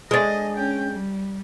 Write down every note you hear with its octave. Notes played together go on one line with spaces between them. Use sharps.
G#3 D4 D#5
C#4 G5
G3